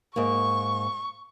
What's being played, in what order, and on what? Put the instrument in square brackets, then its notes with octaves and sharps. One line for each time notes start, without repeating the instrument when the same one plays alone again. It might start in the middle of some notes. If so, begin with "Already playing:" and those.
[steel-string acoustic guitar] G#2 A#3 [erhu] C#6